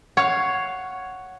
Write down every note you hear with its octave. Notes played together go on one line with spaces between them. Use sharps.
C#5 F5 F#5